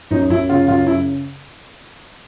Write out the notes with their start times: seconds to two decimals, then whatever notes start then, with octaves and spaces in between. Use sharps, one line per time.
0.11 F#2 D#4
0.30 F#2 E4
0.49 C#3 F4
0.68 F#2 F4
0.87 C#3 E4